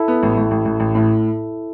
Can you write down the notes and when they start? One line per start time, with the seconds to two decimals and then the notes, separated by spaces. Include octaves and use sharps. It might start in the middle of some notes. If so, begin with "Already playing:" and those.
Already playing: E4 A4
0.08 B3
0.23 A1
0.37 A1
0.51 A1
0.65 A1
0.80 A1
0.95 A2